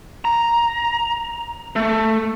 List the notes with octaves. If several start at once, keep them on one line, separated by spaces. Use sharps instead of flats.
A#5
A3